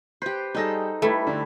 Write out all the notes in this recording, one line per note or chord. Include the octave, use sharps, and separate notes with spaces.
G4 B4 C5
G3 D#4 G#4 A4 A#6
G3 A3 E4 B4 E5
D3 D4